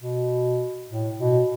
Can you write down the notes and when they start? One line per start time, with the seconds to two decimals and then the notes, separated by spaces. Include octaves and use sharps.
0.02 B2
0.90 A2
1.19 B2